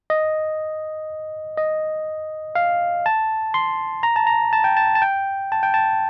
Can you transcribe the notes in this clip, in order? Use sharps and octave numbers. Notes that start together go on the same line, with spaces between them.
D#5
D#5
F5
A5
C6
A#5
A5
A#5
A5
G5
A5
A5
G5
A5
G5
A5